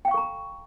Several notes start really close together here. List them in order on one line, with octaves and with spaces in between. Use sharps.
G5 F5 C#6 A4 A#5